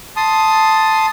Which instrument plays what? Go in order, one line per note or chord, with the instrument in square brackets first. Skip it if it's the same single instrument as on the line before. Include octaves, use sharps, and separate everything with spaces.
[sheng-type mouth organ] A5 C6 D#6